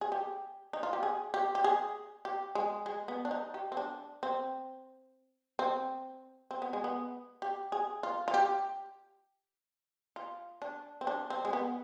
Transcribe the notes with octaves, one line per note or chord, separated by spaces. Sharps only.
G#4
G4
D#4
F4
G4
G#4
G4
G4
G#4
G4
G#3
G#3
B3
D4
D#4
G4
C4
D4
C4
C4
C4
B3
G#3
B3
G4
G#4
F4
F4
G4
F4
D4
C4
D4
C4
G#3
B3